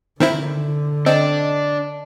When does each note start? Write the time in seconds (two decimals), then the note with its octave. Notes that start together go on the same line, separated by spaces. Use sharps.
0.20 D3 D#3 C4 E4
1.06 C4 D4 D#5 G5